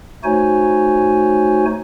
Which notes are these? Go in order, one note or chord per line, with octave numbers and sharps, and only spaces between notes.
A3 D#4 F#4 C5 C#5 G#5